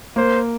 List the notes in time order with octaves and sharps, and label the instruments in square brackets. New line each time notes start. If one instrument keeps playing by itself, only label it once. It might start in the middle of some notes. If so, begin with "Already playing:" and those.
[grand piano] A#3 [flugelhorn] C5